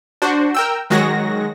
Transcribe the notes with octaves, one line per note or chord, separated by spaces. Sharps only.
D4 F#4 C5
A#4 G5 E6
D#3 F#3 G#3 F#4 A#6